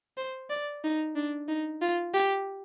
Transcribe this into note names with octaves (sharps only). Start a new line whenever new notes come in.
C5
D5
D#4
D4
D#4
F4
G4